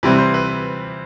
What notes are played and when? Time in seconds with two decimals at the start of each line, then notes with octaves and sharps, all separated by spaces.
0.03 C3 E3 G3 C4 E4 B4
0.18 C5
0.34 B4